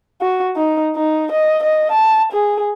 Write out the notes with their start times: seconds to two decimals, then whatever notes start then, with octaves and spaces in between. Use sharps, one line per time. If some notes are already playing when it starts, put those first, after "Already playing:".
0.21 F#4
0.57 D#4
0.96 D#4
1.32 D#5
1.63 D#5
1.92 A5
2.32 G#4